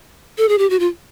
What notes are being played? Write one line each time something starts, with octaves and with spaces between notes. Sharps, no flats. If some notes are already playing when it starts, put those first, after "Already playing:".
A4
G#4
G4
F#4
F4